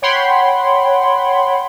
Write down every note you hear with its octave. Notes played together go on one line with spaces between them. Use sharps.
C#5 F#5 G5 B5 C6